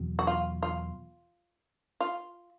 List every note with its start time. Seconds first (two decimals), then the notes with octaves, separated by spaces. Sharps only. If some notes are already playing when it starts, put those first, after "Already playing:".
Already playing: E2 B2 F#3
0.19 F#4
0.27 F4
0.63 F4
2.01 F4